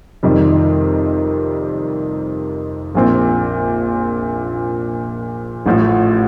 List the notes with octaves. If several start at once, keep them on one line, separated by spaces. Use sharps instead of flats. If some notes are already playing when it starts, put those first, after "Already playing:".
F2 C3 D#3 G3
A#1 A#2 F3 C4
A1 A2 F3